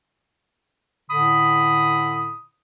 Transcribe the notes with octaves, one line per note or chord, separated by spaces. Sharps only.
A2 D3 B5 D#6